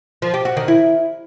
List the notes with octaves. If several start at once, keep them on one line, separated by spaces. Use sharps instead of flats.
F3
G4
F#4
D#3
E4